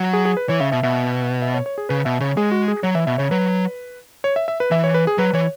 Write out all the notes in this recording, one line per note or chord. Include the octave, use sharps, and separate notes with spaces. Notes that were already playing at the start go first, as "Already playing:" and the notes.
Already playing: F#3
G#4
G#4
B4
E3 C#5
C#3 E5
B2 E5
B2 E5
E5
C#5
C#5
G#4
C#3 B4
B2 E5
C#3 C#5
G#3 G#4
F#4
G#4
F#3 C#5
E3 E5
B2 E5
C#3 C#5
F#3 B4
C#5
E5
E5
B4
E3 E5
C#5
B4
G#4
F#3 B4
E3 C#5